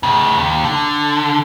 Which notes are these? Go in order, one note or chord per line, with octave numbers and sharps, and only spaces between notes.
A2 C#3
D#2
D3